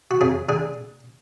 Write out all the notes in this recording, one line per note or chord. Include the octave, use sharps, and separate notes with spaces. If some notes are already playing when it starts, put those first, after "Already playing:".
F#4
F2 G#4
D3 G#4